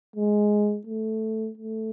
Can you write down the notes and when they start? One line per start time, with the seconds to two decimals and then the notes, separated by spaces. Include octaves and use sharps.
0.16 G#3
0.87 A3
1.57 A3